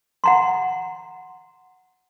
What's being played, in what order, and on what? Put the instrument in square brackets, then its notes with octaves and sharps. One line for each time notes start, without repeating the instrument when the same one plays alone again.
[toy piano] F#5 A#5 C6